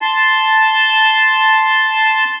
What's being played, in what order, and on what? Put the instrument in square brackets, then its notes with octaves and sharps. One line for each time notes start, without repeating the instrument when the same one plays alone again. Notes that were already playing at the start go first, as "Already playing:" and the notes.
[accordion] A5 C6